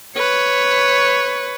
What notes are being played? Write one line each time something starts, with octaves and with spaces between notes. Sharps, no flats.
B4 C#5